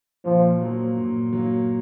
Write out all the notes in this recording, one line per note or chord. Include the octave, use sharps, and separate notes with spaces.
A#2 F3
F#3 A#3
A#2
F#3 A#3